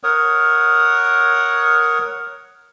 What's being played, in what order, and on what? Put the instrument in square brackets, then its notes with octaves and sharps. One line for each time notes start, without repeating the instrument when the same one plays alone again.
[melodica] A#4 C#5 F#5 D#6